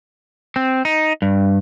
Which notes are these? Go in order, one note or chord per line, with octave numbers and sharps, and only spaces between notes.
C4
D#4
G2